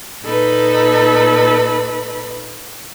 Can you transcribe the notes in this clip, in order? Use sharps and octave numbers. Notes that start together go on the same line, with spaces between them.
A#2 D#4 A4 B4 B5